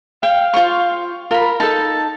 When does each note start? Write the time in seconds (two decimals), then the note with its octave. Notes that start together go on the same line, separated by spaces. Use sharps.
0.23 F5 G5
0.54 F4 C5 C#6
1.31 F4 A#4 B5
1.60 D#4 A4 A5